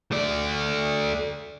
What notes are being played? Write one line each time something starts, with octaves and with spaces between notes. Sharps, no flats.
A3 D5